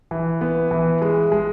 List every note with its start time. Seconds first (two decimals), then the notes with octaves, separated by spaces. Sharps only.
0.11 E3
0.41 B3
0.71 E3
1.02 G#3
1.32 G#3